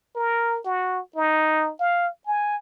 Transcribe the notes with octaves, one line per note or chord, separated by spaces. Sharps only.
A#4
F#4
D#4
F5
G#5